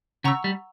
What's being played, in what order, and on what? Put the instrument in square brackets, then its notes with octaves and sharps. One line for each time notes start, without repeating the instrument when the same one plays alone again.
[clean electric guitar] C#3 [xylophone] F#5 A#5 C#6 E6
[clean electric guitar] G3